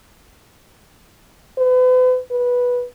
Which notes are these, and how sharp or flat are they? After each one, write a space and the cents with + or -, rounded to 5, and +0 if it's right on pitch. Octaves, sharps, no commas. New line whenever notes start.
B4 +40
B4 -10